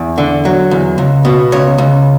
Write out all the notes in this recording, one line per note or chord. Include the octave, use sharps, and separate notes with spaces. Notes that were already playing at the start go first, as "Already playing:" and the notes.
Already playing: E2
D3
F#3
E2
C#2
B2
C#2 C#5
C#2